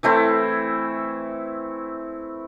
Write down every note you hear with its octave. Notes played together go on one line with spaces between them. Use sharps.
E3 A3 C4 E4